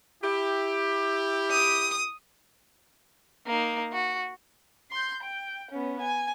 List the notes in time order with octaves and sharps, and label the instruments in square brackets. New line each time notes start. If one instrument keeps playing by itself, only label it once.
[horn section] E4 G4
[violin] D#6
A#3 D#4
F#4
C6 G6
G5
B3 C#4
G#5